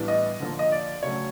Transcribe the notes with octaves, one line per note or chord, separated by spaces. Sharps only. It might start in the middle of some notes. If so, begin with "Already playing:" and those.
Already playing: A2 E3 G3 B3 D4
D#5
D3 F3 A#3
D#5
D5
C#3 F#3 A3 C#4 C#5